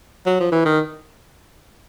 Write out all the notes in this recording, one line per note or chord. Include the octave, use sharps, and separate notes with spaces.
F#3
F3
E3
D#3